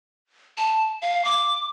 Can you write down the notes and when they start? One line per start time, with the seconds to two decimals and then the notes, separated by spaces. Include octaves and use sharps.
0.57 A5
1.02 F5
1.25 D6